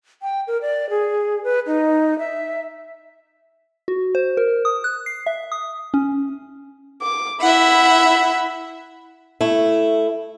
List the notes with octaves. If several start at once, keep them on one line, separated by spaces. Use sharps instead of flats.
G5
A#4
D5
G#4
B4
D#4
E5
F#4
C5
A#4
D#6
F#6
C7
E5
D#6
C#4
D6
E4 E5 F#5 B5
A3 E4